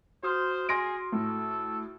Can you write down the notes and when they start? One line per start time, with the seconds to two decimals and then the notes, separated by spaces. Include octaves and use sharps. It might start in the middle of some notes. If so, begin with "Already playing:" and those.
0.23 F#4 C5 D#6 F6
0.69 G#4 C6 A#6 D7
1.13 A2 A4